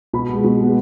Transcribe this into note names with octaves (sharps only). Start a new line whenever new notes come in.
B2 B5
G#3 B3
B2
G#3 B3